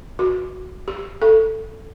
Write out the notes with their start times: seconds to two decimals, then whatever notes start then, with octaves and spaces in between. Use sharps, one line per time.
0.19 F#4
0.88 G4
1.22 A4